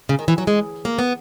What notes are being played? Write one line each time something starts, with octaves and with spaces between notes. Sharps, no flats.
C#3
D#3
E3
F#3
G#3
A#3
B3